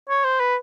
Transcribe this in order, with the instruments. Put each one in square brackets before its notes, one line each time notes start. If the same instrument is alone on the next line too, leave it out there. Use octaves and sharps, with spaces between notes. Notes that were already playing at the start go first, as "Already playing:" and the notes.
[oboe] C#5
C5
B4